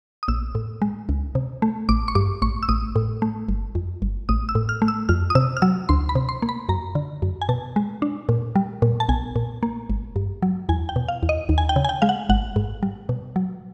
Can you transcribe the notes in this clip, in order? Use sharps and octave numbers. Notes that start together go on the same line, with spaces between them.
D#6
A#1 E6
A2
G#3
C#2
C3
A3
A1 D6
C#6
G2 D6
A1 C#6
E6
A1 D#6
A2
A3
G1
F2
G1
A1 D#6
E6
A2
F6
A3
E6
F2 F6
D#6
C3 E6
F6
F#3 E6
D2 C6
B5
C3
C6
A#3
B5
F#2 A#5
D3
F#2
G#5
B2 A5
G#3
D4
A#2
G3
A#2
A5
B1 G#5
A#2
A#3
G#1
G2
F#3
E2 G#5
G5
B2
F5
E2
D#5
D#2
G#5
G5
C#3
G#5
G5
G#3 F5
F#5
G#1 F#5
G#2
G3
B2
F#3